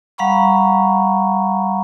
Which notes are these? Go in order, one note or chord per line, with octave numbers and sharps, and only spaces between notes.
G3 F5 F#5 A#5 B5 C#6